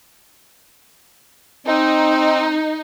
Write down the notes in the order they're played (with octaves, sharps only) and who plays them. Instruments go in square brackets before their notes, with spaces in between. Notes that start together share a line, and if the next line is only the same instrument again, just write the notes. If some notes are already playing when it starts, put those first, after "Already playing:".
[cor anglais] C4 [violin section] D#4